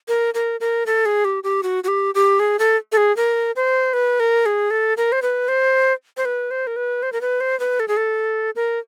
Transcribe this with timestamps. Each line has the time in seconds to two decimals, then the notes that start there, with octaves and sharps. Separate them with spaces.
0.08 A#4
0.34 A#4
0.60 A#4
0.86 A4
1.06 G#4
1.25 G4
1.44 G4
1.63 F#4
1.84 F#4
1.88 G4
2.15 G4
2.40 G#4
2.59 A4
2.92 A4
2.97 G#4
3.17 A#4
3.56 C5
3.93 B4
4.20 A#4
4.46 G#4
4.71 A4
4.97 A#4
5.12 C5
5.22 B4
5.48 C5
6.17 C5
6.25 B4
6.51 C5
6.67 A#4
6.76 B4
7.03 C5
7.13 A#4
7.21 B4
7.41 C5
7.60 B4
7.80 A4
7.88 G#4
7.97 A4
8.56 A#4